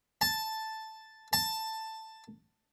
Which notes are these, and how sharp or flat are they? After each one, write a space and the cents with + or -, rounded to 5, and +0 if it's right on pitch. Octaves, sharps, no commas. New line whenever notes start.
A5 +0
A5 +10